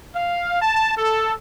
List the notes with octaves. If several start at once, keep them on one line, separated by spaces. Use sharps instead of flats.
F5
A5
A4